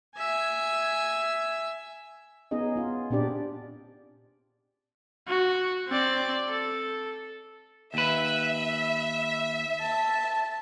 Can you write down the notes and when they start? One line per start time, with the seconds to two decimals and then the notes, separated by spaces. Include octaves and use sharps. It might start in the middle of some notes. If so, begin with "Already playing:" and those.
0.17 E5 G#5
2.51 B3 C#4 D#4 G#4 D#5
2.76 B3 F4
3.10 A#2 C4 D4 G4 D5
5.28 F#4
5.88 C4 D5
6.48 A4
7.94 D#2 B4 E5
9.80 A5